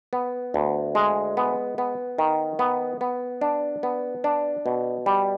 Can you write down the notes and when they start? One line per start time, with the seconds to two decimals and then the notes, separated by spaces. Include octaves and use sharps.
0.13 B3
0.54 D2
0.95 G#3
1.37 B3
1.78 B3
2.18 D#3
2.59 B3
3.01 B3
3.41 D4
3.83 B3
4.24 D4
4.66 B2
5.06 G3